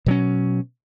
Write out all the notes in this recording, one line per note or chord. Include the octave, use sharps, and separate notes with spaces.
B2 F#3 C#4